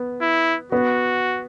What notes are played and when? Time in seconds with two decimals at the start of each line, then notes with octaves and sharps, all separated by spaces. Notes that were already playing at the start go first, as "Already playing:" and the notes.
Already playing: B3
0.21 E4
0.72 B3 F#4